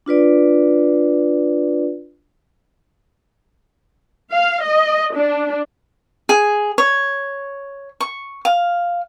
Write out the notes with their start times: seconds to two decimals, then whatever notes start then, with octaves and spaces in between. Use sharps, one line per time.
0.06 D4 F4 B4 D5
4.31 F5
4.62 D#5
5.14 D4
6.29 G#4
6.78 C#5
8.00 C#6
8.45 F5